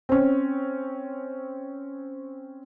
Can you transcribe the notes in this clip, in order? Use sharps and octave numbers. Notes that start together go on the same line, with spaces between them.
C4 C#4